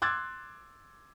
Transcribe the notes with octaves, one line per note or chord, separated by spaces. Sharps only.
C6 D6 E6 F#6 G#6 A6